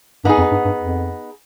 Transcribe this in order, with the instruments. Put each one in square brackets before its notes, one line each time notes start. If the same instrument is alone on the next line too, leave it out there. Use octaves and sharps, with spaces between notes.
[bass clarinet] G2 [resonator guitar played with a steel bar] B3 D#4 G#4
[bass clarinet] F2
G2
G2
F2